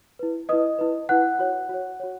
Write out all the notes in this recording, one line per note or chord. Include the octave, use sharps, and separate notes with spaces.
E4 B4
E4 B4 D#5 D#6
E4 B4
E4 B4 F#5 F#6
F#4 C#5
F#4 C#5
F#4 C#5